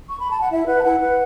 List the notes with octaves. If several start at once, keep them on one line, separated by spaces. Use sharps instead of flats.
C#6
B5
A5
F#5
E4 E5
B4 F#5
A5
E4 F#5
B4